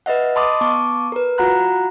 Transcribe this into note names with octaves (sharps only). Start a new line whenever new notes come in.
B4 D#5 E5 F#5
D#5 A5 B5 C6 D6 D#6
B3 A5 C#6 D6
A#4 B4
F4 F#4 F#5 A#5 B5 F#6